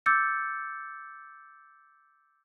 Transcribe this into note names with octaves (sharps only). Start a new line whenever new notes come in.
D6 E6 G6 A6 C#7